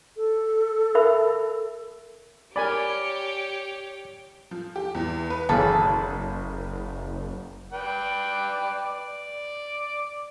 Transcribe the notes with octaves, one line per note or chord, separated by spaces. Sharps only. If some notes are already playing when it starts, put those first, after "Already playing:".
A4
A#4 E5 B5
G4 A#4 C#5 D5 G#5 B5
F3
G4
E2
B4
F#1 B1 C#3 E3 A4
B4 D5 G5
D5